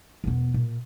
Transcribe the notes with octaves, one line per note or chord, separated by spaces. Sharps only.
E1 B3
A#2